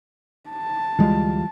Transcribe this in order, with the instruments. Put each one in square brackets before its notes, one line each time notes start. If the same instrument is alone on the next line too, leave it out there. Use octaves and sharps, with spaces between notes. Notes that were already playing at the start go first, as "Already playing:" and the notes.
[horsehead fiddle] A5
[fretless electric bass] D2 G#3 [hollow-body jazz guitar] E3 G3 F4